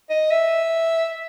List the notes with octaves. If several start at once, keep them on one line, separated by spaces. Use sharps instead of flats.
D#5
E5